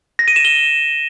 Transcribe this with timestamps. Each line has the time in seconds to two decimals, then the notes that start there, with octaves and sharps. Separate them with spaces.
0.19 A#6
0.28 D#7
0.36 E7
0.45 G7